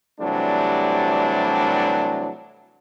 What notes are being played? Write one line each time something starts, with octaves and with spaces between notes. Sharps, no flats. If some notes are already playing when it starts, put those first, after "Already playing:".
C3 E3 F#3 G3 A3 D4